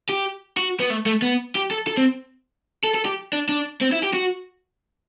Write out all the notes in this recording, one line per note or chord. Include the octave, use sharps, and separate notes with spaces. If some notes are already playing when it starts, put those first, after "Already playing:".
G4
F#4
B3
A3
A3
B3
G4
A4
A4
C4
A4
A4
G4
D4
D4
C4
E4
G4
F#4